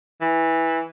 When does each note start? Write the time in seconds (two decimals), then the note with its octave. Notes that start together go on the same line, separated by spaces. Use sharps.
0.21 E3